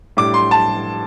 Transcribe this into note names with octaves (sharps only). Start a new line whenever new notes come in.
A2 G3 D4 D6
C6
A5